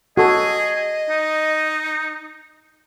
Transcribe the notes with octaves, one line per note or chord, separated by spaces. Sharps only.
F#4 G#4 A4 D#5
D#4